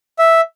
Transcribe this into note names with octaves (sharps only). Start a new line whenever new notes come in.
E5